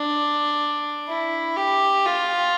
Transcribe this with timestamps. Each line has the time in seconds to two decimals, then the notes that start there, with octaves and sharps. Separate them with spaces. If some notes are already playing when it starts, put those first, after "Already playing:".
Already playing: D4
1.08 E4
1.57 G4
2.06 F4